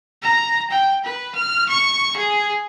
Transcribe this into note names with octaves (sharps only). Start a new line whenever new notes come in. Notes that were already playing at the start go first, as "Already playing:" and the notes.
A#5
G5
B4
F6
C#6
G#4